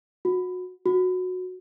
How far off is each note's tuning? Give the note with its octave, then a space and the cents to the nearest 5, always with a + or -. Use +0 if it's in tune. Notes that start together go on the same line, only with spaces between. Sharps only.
F#4 -25
F#4 -15